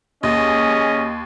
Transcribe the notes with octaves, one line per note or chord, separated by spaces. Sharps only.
D#2 C#4 G#4 D#5